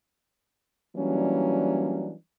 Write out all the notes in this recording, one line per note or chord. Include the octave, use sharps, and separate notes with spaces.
E3 F#3 G3 A#3 C#4 D4